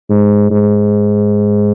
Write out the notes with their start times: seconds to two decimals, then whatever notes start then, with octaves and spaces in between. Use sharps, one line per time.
0.10 G#2
0.51 G#2